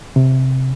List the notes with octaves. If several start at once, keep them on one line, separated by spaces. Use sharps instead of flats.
C3